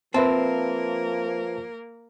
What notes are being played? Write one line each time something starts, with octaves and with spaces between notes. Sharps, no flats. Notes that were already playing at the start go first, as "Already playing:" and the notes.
F3 A#3 C4 A#4 B4 E5 A5